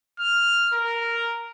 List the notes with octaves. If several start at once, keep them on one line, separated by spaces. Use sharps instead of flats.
F6
A#4